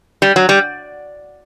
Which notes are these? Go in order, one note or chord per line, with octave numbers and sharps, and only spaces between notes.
G3
F#3
G3